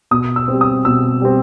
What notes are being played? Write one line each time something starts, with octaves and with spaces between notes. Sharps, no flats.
B2 D#6
E6
G3 C4
D#6
B2 E6
G3 C4